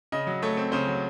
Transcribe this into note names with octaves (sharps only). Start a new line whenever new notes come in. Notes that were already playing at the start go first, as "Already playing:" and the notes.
C#3 D#5
F#3
A3 C#5
C4
C#3 C5
F#3